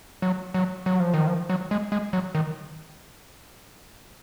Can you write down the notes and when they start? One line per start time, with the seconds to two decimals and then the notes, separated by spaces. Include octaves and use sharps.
0.22 F#3
0.54 F#3
0.86 F#3
1.00 F3
1.14 D#3
1.27 F3
1.50 F#3
1.71 G#3
1.92 G#3
2.13 F#3
2.35 D#3